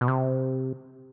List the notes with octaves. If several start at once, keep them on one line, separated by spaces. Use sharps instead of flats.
B2
C3